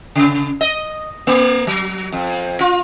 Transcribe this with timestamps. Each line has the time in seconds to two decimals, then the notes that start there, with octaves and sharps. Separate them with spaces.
0.15 C#3
0.61 D#5
1.27 A#3
1.67 F#3
2.13 F2
2.60 F4